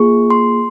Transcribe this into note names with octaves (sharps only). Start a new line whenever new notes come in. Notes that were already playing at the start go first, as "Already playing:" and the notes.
Already playing: A#3 F4 G#4 C#6
C6